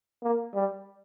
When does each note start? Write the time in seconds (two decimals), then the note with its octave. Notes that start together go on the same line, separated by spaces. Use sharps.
0.23 A#3
0.55 G3